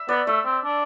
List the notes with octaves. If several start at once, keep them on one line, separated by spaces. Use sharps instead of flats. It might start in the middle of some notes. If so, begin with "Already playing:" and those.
Already playing: E5
B3 D5
A3 E5
C4
D4